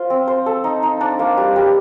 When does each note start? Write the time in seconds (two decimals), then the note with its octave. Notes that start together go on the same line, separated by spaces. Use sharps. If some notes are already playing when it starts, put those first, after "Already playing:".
Already playing: F4 C5
0.10 C4
0.28 C5
0.46 A4
0.64 D#4
0.83 D#4
1.01 D4
1.19 A#3
1.37 G3
1.56 G3